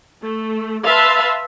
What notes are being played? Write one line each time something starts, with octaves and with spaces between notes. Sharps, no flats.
A3
B4 E5 F5 A5 C6